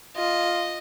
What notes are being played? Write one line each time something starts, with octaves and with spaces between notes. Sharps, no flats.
F4 D#5